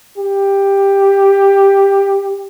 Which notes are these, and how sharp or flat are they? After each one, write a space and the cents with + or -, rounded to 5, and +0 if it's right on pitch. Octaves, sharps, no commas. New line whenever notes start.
G4 +10